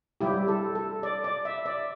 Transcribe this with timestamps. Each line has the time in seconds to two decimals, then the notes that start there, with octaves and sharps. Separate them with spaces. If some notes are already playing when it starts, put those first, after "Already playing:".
0.21 G3 E4 G4
0.48 A4
0.75 A4
1.03 D5
1.24 D5
1.45 E5
1.66 D5